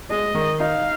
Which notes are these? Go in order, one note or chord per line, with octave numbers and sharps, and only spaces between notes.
G#3 D#5
D#3
D#4 F5